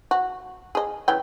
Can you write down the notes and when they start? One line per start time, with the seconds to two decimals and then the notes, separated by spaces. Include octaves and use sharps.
0.11 F#4
0.75 G#4 D#5
1.08 C#3 E3 G5